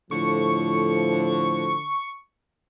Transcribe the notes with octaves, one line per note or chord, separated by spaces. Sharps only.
A2 D3 F3 C#6